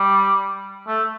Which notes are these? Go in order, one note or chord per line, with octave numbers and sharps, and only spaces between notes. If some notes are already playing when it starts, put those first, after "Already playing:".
Already playing: G3
A3